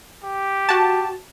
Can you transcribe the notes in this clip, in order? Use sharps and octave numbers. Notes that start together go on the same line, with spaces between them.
G4
F#4 A5